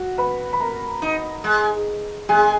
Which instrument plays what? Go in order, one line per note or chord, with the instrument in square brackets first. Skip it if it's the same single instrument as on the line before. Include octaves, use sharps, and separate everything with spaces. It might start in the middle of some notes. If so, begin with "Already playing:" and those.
Already playing: [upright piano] F#4 F#5
B4 B5
B5
A#4 A#5
[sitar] D#4
G#3
[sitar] G#3 [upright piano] G#4 G#5